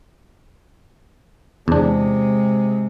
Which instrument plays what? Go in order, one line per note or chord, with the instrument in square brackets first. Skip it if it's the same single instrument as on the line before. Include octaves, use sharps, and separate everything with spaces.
[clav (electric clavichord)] E2 D4 [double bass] C3 G#3